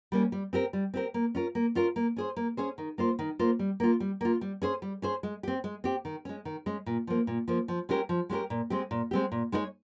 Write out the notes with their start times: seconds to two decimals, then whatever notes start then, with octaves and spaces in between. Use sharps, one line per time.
0.12 G3 A#3 C#4
0.32 G3
0.53 C4 G4 A#4
0.73 G3
0.94 C4 G4 A#4
1.14 A#3
1.35 C#4 F4 A#4
1.55 A#3
1.75 C#4 F4 A#4
1.96 A#3
2.16 C#4 G#4 C5
2.36 A#3
2.57 C#4 G#4 C5
2.78 D#3
2.98 A#3 F4 C5
3.19 D#3
3.39 A#3 F4 C5
3.59 G3
3.80 A#3 F4
4.00 G3
4.21 A#3 F4
4.41 G3
4.62 C#4 G#4 C5
4.82 G3
5.02 C#4 G#4 C5
5.23 G#3
5.43 C4 G4
5.64 G#3
5.84 C4 G4
6.05 D#3
6.25 G#3 C#4
6.45 D#3
6.66 G#3 C#4
6.86 A#2
7.07 F3 A#3
7.27 A#2
7.48 F3 A#3
7.68 F3
7.89 G#3 C#4 G4 A#4
8.09 F3
8.30 G#3 C#4 G4 A#4
8.50 A#2
8.70 G#3 C4 G4
8.91 A#2
9.11 G#3 C4 G4
9.32 A#2
9.52 G#3 D#4 A#4 C#5